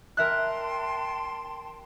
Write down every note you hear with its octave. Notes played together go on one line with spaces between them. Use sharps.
A#4 E5 G5 A5 C6 F#6